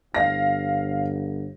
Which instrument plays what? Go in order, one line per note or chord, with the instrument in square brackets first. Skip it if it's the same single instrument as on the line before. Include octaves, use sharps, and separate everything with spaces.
[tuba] G1 [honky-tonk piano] F5 A#6